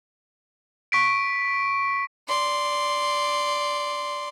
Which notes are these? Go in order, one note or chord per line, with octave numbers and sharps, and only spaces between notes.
C#6 B6 D7
D5 C6